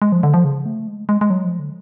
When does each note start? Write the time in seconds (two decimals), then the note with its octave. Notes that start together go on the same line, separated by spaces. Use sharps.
0.02 G#3
0.12 F3
0.23 D3
0.34 F3
0.44 C#3
0.66 A3
0.87 G#3
1.09 G#3
1.21 G#3
1.30 F#3
1.45 F3
1.59 D3